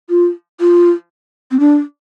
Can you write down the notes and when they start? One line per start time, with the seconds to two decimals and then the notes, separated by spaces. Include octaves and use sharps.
0.10 F4
0.60 F4
1.51 C4
1.60 D4